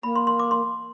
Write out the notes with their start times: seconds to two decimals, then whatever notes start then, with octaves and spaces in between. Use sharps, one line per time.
0.03 A#3 B5
0.16 C6
0.27 C6
0.39 D6
0.51 C6